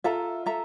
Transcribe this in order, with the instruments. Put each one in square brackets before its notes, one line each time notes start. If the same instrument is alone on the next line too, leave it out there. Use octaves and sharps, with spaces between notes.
[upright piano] F4 [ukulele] A4 E5 A#5
[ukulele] A4 E5 A#5